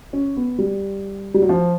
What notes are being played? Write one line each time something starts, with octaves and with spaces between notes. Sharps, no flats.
C#4
B3
G3
G3
F#3
F3